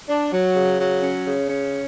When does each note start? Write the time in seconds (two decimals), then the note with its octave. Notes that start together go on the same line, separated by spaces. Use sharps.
0.09 D4
0.33 F#3
0.55 C#3
0.79 F#3
1.03 C#4
1.26 C#3
1.50 C#4